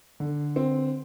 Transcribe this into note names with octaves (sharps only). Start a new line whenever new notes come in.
D3
C4